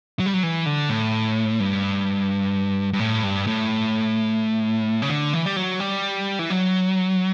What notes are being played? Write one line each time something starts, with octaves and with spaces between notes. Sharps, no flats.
F#3
G3
F#3
E3
D3
A2
G2
G2
A2
G2
A2
C#3
D3
E3
G3
F#3
G3
E3
F#3